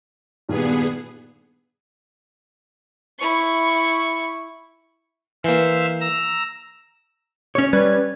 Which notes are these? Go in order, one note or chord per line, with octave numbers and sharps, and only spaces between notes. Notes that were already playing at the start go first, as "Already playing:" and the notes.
G2 A#2 D#3 B3 G#4
E4 C#6
E3 A#3 C5 E5 F5
A#5 E6 A#6
C#4 C#5
G3 B4 G#6